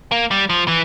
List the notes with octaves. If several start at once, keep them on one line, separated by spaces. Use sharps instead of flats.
A#3
G3
F3
E3